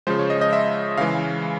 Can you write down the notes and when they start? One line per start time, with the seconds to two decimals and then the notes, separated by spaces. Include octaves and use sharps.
0.07 C#3 F3 G#3 C5
0.19 C#5
0.30 D#5
0.41 D#5
0.53 E5
0.97 C#3 E3 G#3 F5